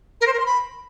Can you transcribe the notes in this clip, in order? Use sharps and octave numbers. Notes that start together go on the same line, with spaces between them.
A#4
C5
A#4
C6
B5